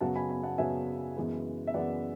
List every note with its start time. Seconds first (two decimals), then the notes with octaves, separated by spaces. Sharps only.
0.01 F#2 C#3 F#3 B3 F#5 A5
0.15 G#5 B5
0.29 G#5 B5
0.43 F#5 A5
0.58 F#2 C#3 F#3 B3 E5 G#5
1.16 F#2 E3 G#3 B3
1.67 E5
1.74 F#2 E3 G#3 B3 D5 F#5